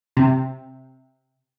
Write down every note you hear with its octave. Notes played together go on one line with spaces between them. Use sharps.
C3